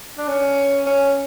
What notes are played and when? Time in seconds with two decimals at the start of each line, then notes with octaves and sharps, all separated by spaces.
0.18 D4
0.28 C#4
0.86 C#4